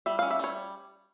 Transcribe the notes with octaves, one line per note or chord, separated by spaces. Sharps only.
G3 E5
C#4 F5
E5
G3 C#5